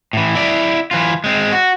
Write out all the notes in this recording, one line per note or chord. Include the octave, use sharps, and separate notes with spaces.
A2 E3
E4 D5
E3 F4
G#3 C4
F#4